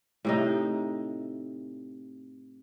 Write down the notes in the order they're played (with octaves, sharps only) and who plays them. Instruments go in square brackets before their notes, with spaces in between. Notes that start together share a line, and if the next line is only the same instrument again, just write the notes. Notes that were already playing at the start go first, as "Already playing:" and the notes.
[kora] A2 C3 D#4